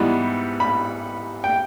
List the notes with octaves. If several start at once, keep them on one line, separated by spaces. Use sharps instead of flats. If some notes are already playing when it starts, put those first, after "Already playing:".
Already playing: G#2 E3 G3 B3
B5
G5